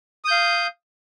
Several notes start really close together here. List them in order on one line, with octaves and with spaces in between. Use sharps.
D#6 G6 F5